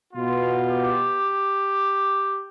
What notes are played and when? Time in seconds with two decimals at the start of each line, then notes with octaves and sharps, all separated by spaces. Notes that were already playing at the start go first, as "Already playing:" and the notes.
0.12 B2 B3 F4
0.70 G4